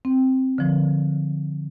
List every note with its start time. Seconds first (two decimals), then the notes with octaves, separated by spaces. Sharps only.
0.05 C4
0.58 D3 F3